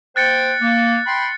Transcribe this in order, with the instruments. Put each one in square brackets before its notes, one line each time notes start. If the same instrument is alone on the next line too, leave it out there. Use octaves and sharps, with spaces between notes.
[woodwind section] A#3 C5 G5 [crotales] F#6 A6 C#7
[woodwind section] A#3
G5 B5 C6